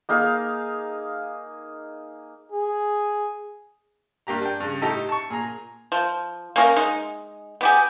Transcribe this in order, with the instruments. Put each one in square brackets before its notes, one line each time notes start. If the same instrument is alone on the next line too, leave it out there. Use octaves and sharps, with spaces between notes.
[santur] A#3 D#4 G#4 F5
[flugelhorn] G#4
[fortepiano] G2 A#3 G4 A#5
D4 G5
G2 C#3
A2 D#4 G4 A4 A#5 E6
A5 C#6
A#2 G#4 A#5
[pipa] F3
A#3 C#4 G#4 A#4
G#3 D#4
B3 G4 G#4